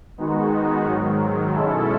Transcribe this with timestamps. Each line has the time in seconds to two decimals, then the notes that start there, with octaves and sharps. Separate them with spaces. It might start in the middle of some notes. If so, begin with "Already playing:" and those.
0.18 D#3 G#3 B3 D#4 F#4
0.85 G#2 D#3 F#3
1.53 B2 G#3 C#4 E4 A4